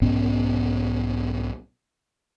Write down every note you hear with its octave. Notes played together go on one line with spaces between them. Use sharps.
B1 G#2 B3 C#4